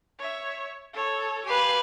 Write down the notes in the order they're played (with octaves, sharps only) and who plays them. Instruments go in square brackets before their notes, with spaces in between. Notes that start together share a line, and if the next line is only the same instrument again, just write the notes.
[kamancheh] C#5 E5
A4 C#5
[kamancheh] G4 [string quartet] B4 F5 G#5